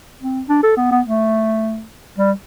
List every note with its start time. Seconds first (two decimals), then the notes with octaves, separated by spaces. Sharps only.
0.21 C4
0.49 D4
0.63 A4
0.77 B3
0.91 B3
1.06 A3
2.18 G3